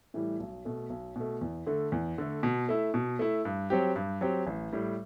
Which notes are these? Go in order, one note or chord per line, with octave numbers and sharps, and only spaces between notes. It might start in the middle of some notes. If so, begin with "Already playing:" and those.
A2 E3 G3
B1
B2 A3
B1
B2 A3
E2
D3 A3
E2
D3 A3
B2
A3 E4
B2
A3 E4
G2
F#3 C4 G4
G2
F#3 C4 G4
A1
A2 G3